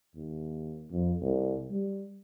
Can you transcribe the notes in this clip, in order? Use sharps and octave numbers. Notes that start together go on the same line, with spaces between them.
D#2
F2
C2
G3